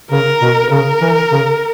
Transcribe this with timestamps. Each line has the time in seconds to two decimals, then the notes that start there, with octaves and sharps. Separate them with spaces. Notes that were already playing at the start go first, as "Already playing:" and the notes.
0.11 C#3 A#4
0.41 B2
0.71 C#3 A#4
1.01 E3
1.31 C#3